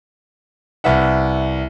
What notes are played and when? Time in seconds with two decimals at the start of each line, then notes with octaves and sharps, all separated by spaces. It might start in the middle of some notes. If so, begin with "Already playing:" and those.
0.84 C2 B4 E5 F#5